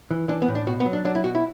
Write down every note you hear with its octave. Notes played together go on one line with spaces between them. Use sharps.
E3
E3 D4
B3
A2
D4
B2 F#4
B3
F#3
D4
F#3 D4
E4
B2 F#4
E4